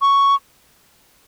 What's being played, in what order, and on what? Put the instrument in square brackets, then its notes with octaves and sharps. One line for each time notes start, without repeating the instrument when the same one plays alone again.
[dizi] C#6